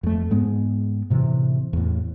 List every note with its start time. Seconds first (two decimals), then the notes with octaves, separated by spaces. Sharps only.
0.03 F2 A3
0.31 G#2 G#3 B3
1.10 A2 C3 E3
1.73 E2 A2